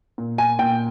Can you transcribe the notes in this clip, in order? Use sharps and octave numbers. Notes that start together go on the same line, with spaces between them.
A#2
G#5
A#2 G5